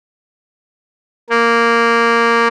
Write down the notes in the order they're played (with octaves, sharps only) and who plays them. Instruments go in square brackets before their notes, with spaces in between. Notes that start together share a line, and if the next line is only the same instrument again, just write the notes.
[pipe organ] A#3